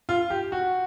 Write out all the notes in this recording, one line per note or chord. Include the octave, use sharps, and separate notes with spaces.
F4
G4
F#4